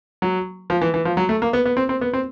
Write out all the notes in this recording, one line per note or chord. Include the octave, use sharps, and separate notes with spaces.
F#3
F3
E3
E3
F3
F#3
A3
A#3
B3
B3
C4
C4
B3
C4